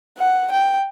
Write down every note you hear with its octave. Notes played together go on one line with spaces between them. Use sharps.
F#5
G5